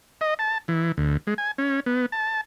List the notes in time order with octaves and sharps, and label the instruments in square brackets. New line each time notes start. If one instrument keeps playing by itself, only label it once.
[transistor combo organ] D#5
A5
E3
D2
G#3
G#5
C#4
B3
A5